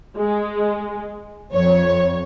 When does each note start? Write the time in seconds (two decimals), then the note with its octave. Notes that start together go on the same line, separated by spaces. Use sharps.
0.17 G#3
1.52 F2 C#5